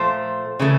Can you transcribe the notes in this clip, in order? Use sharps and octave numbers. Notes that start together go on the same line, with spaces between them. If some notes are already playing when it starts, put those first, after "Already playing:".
Already playing: A#2 F3 A3 C5
C#3 E3 A3